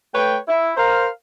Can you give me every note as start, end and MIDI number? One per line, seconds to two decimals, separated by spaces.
0.14 0.37 57
0.14 0.37 71
0.14 0.37 73
0.14 0.37 79
0.47 0.73 64
0.77 1.07 70
0.77 1.07 72
0.77 1.07 77
0.77 1.07 82